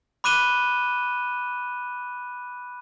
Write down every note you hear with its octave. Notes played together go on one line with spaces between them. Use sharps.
B5 D6 F#6 D#7 E7 G7